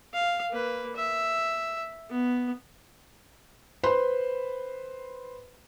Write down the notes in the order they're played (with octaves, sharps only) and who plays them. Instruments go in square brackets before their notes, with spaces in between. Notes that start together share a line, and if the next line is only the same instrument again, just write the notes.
[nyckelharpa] F5
A#3 B4
E5
B3
[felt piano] B4 C5 B5 C6